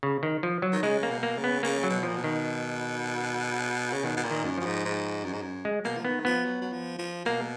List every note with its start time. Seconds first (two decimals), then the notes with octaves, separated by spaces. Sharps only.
0.03 C#3
0.23 D#3
0.43 F3
0.62 F#3
0.72 D#3
0.83 C#3 G#3
1.03 A#3
1.10 B2
1.23 A#3
1.37 C#3
1.44 B3
1.63 C#3 A#3
1.83 F#3
1.90 B2
2.03 A#2 F3
2.16 B2
2.24 D#3
3.92 C#3
4.04 B2 D#3
4.17 B2
4.24 A#2
4.31 D#3
4.44 F#2
4.58 F#2 F3
4.65 G#2
4.85 G#2
5.25 F#2
5.33 G#2
5.42 F#2
5.65 G#3
5.85 B2 A#3
5.97 F3
6.05 D#3 B3
6.25 F3 B3
6.45 F#3
6.61 F#3
6.72 F3
6.98 F3
7.25 B2 A#3